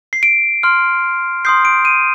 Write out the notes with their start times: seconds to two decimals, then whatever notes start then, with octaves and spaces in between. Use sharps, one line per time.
0.13 C7
0.23 D7
0.63 C6 F6
1.45 C6 D#6 G6 C7
1.65 D7
1.85 D#7